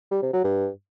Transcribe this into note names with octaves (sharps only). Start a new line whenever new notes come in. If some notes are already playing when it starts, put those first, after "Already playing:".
G3
C3
F#3
G2